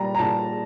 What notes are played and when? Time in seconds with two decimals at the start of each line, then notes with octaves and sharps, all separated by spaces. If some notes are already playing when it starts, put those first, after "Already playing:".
Already playing: A#2 G3 A#5
0.15 A#5
0.19 A#2 A5